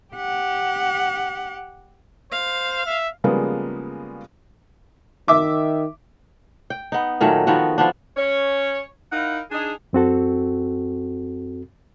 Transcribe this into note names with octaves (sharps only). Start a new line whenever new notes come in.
G4 F#5
C5 F5
E5
C#3 F3 G3 G#3 A#3 B3
D#3 E5 D6
G5
B3 D#4
A#2 D#3 F#3 A3
D#3 F3 B3 F#4
F3 B3 D4
C#4 C#5
D#4 E4 A#4 F5 F#5
D4 D#4 G#4
F#2 C4 F#4 A4